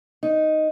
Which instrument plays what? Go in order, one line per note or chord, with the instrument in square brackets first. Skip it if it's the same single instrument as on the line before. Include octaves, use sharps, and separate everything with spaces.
[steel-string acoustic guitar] D#4